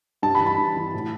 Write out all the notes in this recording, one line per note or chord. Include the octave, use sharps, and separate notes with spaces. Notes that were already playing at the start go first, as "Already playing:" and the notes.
G2 A5
B5
E3
B5
G2
E3
A2